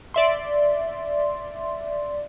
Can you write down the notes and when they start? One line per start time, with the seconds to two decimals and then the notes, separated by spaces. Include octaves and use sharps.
0.14 D5 E5 C6